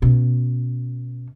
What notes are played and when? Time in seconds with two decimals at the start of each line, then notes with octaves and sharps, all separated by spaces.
0.02 B2 C#4